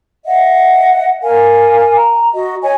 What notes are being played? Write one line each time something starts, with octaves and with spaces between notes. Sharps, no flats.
D#5 E5 F#5
A#4 F5 G#5
A#5
F#4 D#5
C#5 D#5 G#5